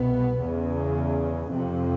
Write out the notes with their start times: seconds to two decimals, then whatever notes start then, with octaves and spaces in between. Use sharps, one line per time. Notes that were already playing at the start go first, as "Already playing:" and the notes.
Already playing: C2 B2 B3
0.39 E2 C#3
1.50 F2 C3